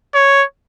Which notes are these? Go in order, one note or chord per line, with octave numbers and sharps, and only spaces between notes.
C#5